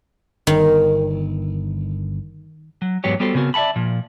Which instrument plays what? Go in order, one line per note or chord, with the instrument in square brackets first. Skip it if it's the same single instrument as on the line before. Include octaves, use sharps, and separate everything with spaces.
[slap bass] G1 [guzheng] D#3
[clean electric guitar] F#3
E2 G#2 F#3 B3 G4 C#5
G3 B3 F#4 G4 A4 C5
C#3 B3 C4 F#4 A#4
D5 E5 F#5 A5 B5
A#2 F3